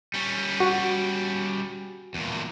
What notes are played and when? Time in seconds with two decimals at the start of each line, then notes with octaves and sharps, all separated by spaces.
0.14 G3 C#4
0.60 F#4
2.14 E2 A#2